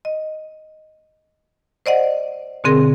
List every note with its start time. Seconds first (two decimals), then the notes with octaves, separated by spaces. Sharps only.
0.05 D#5
1.86 C5 D5 D#5 F#5
2.64 B2 D3 C4 G#4 A#4